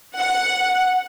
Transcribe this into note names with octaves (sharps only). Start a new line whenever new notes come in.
F#5